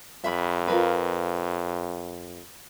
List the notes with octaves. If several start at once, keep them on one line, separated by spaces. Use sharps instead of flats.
F2 E5 B5
F4 A#4 B4